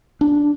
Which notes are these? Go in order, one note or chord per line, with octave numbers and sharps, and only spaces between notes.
D4